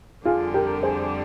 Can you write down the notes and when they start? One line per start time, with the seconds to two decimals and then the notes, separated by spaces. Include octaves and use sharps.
0.25 F2 D3 G3 D4 F4 G#4
0.54 G4 A#4
0.83 G#4 C5